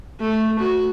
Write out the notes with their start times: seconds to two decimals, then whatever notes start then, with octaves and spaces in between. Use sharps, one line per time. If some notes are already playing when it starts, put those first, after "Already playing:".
0.20 A3
0.59 F#4